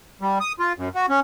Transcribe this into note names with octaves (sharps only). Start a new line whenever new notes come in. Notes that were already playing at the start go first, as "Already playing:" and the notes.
G3
D#6
F4
F#2
F#4
C#4